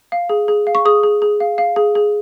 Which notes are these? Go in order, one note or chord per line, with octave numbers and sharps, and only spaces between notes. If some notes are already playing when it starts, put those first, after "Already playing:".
F5
G#4
G#4
F5
C#6
G#4 D#6
G#4
G#4
F5
F5
G#4
G#4